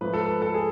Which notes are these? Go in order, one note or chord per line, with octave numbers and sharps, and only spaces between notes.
G#2 F3 A3 B4
A4
B4
A4
G#4